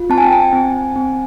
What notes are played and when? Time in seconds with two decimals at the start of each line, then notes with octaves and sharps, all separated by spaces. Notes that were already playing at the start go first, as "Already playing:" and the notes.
Already playing: F4
0.10 C4 A5
0.18 G#5
0.24 G5
0.32 G#5
0.53 C4
0.96 C4